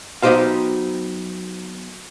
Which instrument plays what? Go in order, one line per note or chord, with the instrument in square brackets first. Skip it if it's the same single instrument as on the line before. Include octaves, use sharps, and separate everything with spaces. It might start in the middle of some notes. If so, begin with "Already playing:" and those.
[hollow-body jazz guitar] F#3 B3 D#4 G4 C5 F5